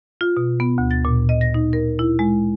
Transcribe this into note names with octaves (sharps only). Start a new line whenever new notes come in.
F4
B2
B3
D2
A6
A#2
D#5
A#6
D#4
A#4
E4
G#3